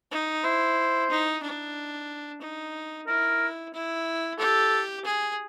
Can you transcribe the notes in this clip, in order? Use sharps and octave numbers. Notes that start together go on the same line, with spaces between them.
D#4
E4 C5
D#4
D4
D#4
E4 A#4
E4
G4 A4
G#4